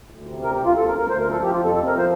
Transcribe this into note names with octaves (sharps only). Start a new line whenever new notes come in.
D2
C3
D2 A#4
G4
D2
F4
D2 A4
A#4
D2
A#4
D2 C5
A#4
F3
A4
F3 G4
F4
F2
A4
C3 A4
A#4
F3
C5